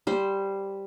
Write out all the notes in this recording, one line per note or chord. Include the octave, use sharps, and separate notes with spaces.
G3 C5